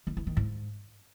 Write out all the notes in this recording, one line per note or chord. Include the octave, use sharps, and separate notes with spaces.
D#3
E3
D#3
G#2